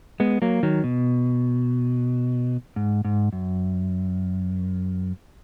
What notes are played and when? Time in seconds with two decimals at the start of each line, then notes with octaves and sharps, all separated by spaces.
0.20 G#3 B3
0.42 F#3 A#3
0.63 D#3 F#3
0.84 B2
2.76 G#2
3.05 G#2
3.33 F#2